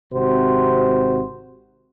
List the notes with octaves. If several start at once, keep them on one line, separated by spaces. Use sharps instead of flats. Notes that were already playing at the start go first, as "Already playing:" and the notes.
G#1 C3 F#4 C5